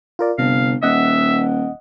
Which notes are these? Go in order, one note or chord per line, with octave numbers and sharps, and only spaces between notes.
F4 A#4 D5
G1 C3 F5
D#1 D#5 E5 F#5